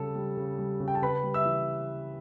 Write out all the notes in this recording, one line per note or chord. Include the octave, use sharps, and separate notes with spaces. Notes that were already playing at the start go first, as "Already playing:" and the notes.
Already playing: C#3 G3 A4 A5
G3
C#3
G3
C#3
G5
A5
C#3 B4 B5
G3
E5 E6
E3